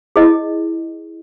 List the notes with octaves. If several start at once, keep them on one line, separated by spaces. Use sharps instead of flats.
E4 G#4 D#5